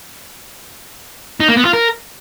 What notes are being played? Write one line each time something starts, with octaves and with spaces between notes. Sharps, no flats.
D#4
A#3
B3
F4
A#4